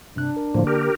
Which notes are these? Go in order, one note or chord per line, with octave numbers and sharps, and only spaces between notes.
G2 C3 D4 F#6
A#4
A2 D3 F3 A#3
G4 A#4